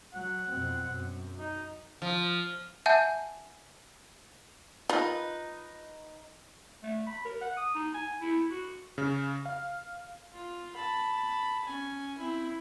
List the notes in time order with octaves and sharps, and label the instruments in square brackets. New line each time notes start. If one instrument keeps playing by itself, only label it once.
[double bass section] F#3 [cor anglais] F#5
[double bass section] F2 B2 C4
F#2
[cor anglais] D#4
[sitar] F3
[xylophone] E5 F#5 G#5 A5 G6
[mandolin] D#4 B4 [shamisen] F4 A#4
[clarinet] A3
B5
A#4
F#5
D#6
D#4
G#5
E4
F#4
[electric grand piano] C#3
F5
[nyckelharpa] F4
A5 B5
C#4 G#5
C4 E4